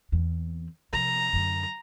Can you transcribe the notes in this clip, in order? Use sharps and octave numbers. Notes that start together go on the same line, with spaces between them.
E2 C4
C3 F3 A#5
F#2 D3